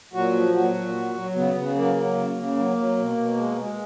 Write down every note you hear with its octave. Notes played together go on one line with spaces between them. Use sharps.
A#2 F#3 F#4
F3
A#2 F#3 F#4
A#2
F#3
F#3
C#3 B3
C#3
F#3 A#3
F#3
C#3
C#3
F#3
F#3
B2
B2
G#3
G#3